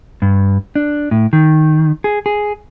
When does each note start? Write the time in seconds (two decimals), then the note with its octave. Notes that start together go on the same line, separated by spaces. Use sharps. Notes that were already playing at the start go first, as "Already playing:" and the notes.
0.22 G2
0.76 D4
1.11 A2
1.33 D#3
2.04 G#4
2.26 G#4